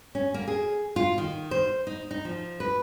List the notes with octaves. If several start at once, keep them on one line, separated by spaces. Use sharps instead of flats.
C#4
A#3
G#4
F4
D#3
C5
D#4
D#4
F3
B4